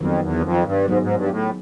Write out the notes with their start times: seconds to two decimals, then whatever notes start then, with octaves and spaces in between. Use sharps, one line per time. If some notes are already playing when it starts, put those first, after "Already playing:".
0.01 F2 D#3 F#3 B3
0.23 E2
0.44 F2
0.66 G2
0.88 G#2 F#3 B3 D#4 G#4
1.02 G#2
1.17 G2
1.31 A2